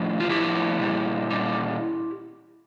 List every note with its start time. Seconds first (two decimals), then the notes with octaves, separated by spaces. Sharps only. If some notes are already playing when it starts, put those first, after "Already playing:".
Already playing: A2 F3
0.20 F4
0.30 A2 F3 E4 G4
0.80 A#2 G3
1.30 A#2 G3